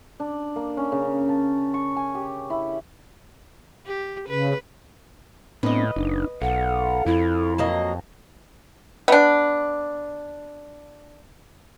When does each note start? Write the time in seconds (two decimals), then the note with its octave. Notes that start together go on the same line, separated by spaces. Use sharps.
0.20 D4
0.56 A#3
0.77 C#4
0.92 C#3
1.29 A5
1.74 C#6
1.96 G#5
2.15 G4
2.50 E4
3.87 G4
4.29 C#3 B4
5.63 A2 B3 C4 D4 B4 D#5
5.96 F#1 D4 D#4
6.42 B1 A4 F5 F#5
7.06 F2 E4
7.58 F#3 A#3 D#5
9.08 B3 D4